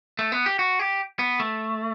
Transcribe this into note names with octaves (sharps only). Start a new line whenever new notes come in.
A3
B3
G4
F#4
G4
B3
A3